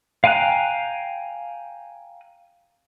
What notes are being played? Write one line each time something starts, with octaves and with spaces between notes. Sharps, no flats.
F5 G5 G#5 A#5 F#6